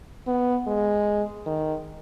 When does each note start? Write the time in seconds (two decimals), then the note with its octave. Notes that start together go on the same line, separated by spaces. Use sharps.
0.27 B3
0.67 G#3
1.46 D#3